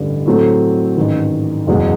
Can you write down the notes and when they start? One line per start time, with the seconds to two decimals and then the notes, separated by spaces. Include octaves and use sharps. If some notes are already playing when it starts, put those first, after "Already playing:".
Already playing: A1 G2 D3
0.26 A2 F#3 A3 C4
0.97 A1 G#2 D#3
1.67 F#1 E2 B2 G#3